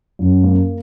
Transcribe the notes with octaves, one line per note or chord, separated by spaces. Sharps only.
F#2
A#3